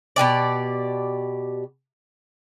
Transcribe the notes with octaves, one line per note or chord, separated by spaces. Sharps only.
B2 E3 G4 D5